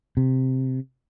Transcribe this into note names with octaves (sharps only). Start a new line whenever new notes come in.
C3